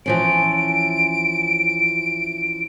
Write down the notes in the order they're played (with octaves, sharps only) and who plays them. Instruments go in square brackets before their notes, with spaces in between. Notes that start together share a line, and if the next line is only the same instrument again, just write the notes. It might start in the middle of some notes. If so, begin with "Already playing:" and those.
[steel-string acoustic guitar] E3 F3 C#4 [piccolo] D7